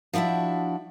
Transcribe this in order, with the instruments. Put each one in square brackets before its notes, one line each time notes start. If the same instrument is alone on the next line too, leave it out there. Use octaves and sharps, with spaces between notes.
[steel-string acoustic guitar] F3 D4 E4 F#4 E5